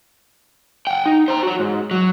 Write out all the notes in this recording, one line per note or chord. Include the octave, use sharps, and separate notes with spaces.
F#5 G5
D#4
C5 A#5
F#4 C#5
G#2
F#3